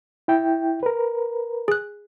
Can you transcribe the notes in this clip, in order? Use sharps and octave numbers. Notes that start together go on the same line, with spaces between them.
E4 G5
A#4 B4
G#4 F#6